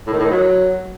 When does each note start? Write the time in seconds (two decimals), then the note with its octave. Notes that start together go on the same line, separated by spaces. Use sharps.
0.07 A2
0.13 D#3
0.19 A2
0.25 D#3
0.31 F#3